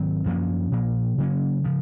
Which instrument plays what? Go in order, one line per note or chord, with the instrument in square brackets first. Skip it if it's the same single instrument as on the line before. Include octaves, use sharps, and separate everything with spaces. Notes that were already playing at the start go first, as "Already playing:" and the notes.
Already playing: [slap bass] G#2 D#3 F#3 C4
F#2 F3 A#3 C#4
A#2 F3 A#3
C#3 F#3 A#3 C#4
C#3 F3